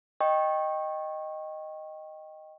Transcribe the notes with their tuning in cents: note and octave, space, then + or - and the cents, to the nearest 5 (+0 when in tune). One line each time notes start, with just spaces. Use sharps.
D#5 +0 G5 +0 C#6 -25